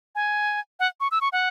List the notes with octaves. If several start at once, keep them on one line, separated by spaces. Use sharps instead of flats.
G#5
F#5
C#6
E6
C#6
F#5